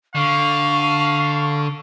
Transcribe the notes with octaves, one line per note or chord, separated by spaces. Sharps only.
D3 F5 C#6